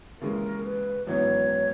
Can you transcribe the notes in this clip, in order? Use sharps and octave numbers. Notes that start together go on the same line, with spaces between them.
D#2 C#3 E3 G#3 A#4
B4
G#1 F#2 E3 B3 C#5